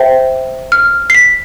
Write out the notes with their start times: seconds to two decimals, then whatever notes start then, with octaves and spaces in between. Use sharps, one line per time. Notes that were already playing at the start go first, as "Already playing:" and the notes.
Already playing: C5 E5 G5
0.72 F6
1.10 C7
1.14 B6